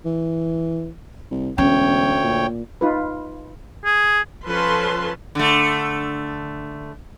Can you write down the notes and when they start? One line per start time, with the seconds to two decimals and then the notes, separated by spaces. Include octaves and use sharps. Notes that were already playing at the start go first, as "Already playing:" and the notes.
0.05 E3
1.31 C2
1.58 E1 D2 C#4 C#5 G5
2.24 A#2
2.81 D#4 F4 B4
3.85 G#4
4.47 F3 C#4 A4 B4 A5 C6
5.35 D3 A3